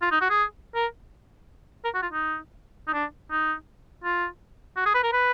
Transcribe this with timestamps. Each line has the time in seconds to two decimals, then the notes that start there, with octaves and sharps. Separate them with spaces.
0.01 F4
0.11 D#4
0.21 F#4
0.30 G#4
0.75 A#4
1.84 A#4
1.94 F#4
2.02 F4
2.12 D#4
2.87 D#4
2.93 D4
3.31 D#4
4.04 F4
4.76 F#4
4.85 G#4
4.94 B4
5.03 A#4
5.12 B4